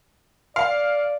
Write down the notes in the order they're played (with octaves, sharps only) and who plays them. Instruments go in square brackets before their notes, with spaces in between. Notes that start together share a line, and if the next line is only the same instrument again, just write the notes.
[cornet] D5 [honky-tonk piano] F5